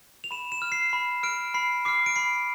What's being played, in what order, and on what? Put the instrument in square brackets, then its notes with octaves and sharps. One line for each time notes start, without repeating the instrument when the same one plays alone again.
[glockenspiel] F7
B5 E7
E7
F6
C7
B5
F6 D7
B5 C7
D6 F6 C7
D7
B5 C7